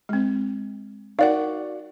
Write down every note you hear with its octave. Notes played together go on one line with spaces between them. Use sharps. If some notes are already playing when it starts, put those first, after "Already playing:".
G#3 C4
D#4 F#4 A#4 D5 F5 F#5